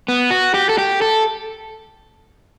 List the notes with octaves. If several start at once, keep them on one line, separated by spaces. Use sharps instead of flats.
B3
F#4
G4
A4
G4
A4